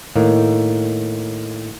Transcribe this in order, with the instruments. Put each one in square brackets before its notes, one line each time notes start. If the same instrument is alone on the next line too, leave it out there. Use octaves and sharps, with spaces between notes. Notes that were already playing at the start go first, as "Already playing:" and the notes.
[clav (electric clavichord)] A2 D#3 A#3